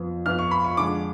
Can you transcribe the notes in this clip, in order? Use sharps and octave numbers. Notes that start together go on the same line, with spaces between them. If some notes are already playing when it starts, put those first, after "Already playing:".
Already playing: F2 F3 B3
F2 F3 B3 F6
C#6
B5
C#6
F2 D3 G#3 D4 D6